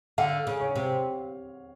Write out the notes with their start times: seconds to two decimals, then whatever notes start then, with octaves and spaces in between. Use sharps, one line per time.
0.18 D3 F5
0.47 C#3
0.61 C#5
0.76 C3